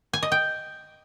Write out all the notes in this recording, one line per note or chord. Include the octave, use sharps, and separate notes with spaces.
G#5
D#5
G5